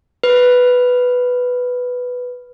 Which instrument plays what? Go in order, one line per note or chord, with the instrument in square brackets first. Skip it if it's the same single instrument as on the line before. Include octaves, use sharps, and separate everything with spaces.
[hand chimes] B4